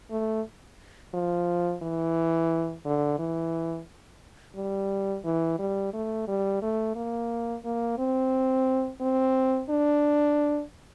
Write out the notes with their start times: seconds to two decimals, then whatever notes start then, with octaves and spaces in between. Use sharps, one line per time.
0.10 A3
1.14 F3
1.82 E3
2.85 D3
3.19 E3
4.56 G3
5.25 E3
5.59 G3
5.93 A3
6.27 G3
6.62 A3
6.95 A#3
7.65 A#3
7.98 C4
9.01 C4
9.70 D4